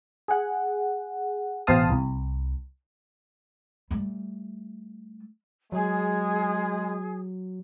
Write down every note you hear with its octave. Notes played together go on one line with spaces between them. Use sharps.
G#4 F#5
A1 B2 C5 F5 A5 D#6
C2
G3 A3
F#3 G#3 G#4